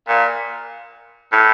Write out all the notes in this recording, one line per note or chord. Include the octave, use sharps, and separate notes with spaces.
A#2
A2